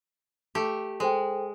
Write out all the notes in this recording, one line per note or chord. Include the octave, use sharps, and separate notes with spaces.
A3 G4
G#3 A4 C5 G5